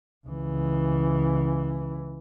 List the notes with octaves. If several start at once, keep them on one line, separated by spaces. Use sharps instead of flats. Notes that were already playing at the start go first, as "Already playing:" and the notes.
C#2 E3